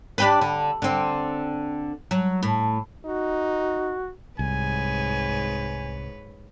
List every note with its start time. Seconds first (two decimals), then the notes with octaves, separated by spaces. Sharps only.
0.18 D4 G4 B4
0.41 D3
0.82 D3 C4
2.11 F#3
2.43 A2
3.05 D#4 F#4
4.39 C2 G#2 B4 C#5 G#5